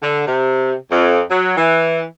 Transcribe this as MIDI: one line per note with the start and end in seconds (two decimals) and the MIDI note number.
0.03 0.25 50
0.27 0.75 48
0.92 1.23 41
1.31 1.55 54
1.58 2.04 52